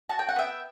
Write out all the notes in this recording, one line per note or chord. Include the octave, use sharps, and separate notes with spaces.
F#4 A5
G5
F#5
B3 E5 G5